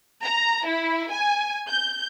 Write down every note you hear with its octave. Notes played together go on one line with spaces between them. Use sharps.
A#5
E4
G#5
G6